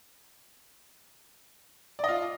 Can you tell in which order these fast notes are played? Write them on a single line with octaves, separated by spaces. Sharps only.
D5 D#5 F4